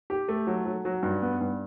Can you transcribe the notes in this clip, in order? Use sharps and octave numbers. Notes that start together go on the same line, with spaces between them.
G4
A3
F#3
F#3
F#3
G2
B3
G2